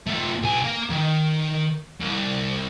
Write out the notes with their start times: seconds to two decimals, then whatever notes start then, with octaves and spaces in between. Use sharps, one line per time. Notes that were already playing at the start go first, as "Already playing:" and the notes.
0.07 A3 F4
0.42 B1 G#5
0.64 A#3
0.91 D#3
2.01 C2